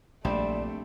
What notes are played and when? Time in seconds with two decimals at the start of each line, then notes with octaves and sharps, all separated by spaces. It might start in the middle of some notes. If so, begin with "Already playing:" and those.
0.25 A#1 G3 A3 C4 D4 D5